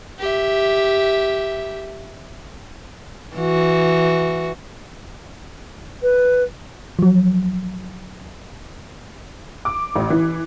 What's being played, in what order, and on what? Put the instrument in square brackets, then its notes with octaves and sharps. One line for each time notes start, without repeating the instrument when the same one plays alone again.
[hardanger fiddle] G4 E5
[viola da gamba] E3 F#4
[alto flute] B4
[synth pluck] F3 F#3
[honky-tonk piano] D6
A1
E3